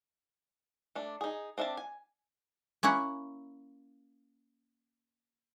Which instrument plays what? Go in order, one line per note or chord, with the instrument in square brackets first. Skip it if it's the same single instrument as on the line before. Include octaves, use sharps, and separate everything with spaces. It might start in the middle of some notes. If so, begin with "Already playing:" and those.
[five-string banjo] A3 D4
D#4 G#4
C4 D4 E5 F5 A5
G#5
[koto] A#3 C#4 E4 F#5